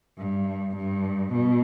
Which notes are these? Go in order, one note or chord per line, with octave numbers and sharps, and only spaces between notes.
G2
G2
B2